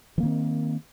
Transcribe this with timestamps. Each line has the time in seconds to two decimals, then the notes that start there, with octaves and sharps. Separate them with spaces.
0.18 E3
0.20 A#3
0.23 D#3
0.25 C4